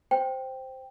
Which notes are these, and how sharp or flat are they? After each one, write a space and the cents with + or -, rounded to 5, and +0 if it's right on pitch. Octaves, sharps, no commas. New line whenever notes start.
C5 +0 G5 +0